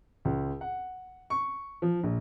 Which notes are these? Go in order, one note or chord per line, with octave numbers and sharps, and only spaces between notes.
C#2
F#5
C#6
F3
A#1